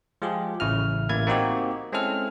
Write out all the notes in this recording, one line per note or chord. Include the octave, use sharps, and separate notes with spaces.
F3 G#3 F4 G4 G#4
A1 C#3 E4 F6
A1 A#3 E4 G#6
A#3 C4 D#4 F#4 G4
G#3 C4 C#4 E4 A4 F6